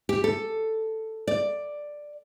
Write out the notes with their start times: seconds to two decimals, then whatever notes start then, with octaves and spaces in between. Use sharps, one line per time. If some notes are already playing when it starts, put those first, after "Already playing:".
0.09 G4
0.24 A4
1.28 D5